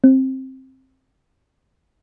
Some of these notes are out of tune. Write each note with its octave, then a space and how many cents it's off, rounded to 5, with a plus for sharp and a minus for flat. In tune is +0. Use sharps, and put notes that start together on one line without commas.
C4 +10